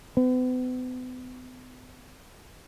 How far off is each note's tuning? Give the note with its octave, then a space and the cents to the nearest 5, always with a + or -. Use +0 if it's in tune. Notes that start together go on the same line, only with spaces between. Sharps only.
B3 +40